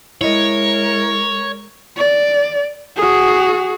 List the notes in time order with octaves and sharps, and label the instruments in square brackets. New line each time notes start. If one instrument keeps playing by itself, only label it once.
[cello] G#3 A#4 [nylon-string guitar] E4 D#5 [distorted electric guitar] C#5
[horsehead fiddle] D5
F#4 G#4